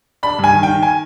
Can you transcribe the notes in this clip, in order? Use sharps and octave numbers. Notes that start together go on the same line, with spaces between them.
D4 B5
G2
G#5
D#3
G5
D#3
G#5